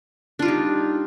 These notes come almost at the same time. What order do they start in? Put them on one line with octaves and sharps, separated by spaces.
D4 F4 G3 D#4